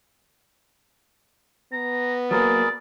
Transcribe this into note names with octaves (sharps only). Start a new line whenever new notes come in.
B3 A#5
F#3 A#3 G#4 A#4 B4 D5